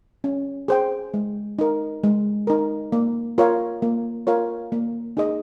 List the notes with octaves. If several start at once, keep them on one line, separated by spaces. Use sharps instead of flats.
C#4
G#4 C5 G5
G#3
D#4 A#4
G#3
D#4 A#4
A#3
F4 A#4 C#5 F5
A#3
F4 A#4 C#5 F5
A#3
D#4 G#4 D#5